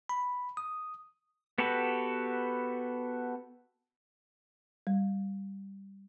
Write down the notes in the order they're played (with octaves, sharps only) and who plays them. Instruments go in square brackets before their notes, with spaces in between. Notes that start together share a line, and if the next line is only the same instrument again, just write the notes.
[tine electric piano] B5
D#6
[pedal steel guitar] B3 F#4 G4 A4 B4
[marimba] G3